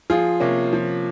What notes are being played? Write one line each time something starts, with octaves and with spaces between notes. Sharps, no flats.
F3 F4 G#4
C3 A#3 C#4
F3